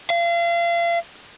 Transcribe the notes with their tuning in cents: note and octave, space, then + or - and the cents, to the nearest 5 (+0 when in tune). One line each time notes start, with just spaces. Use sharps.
F5 -35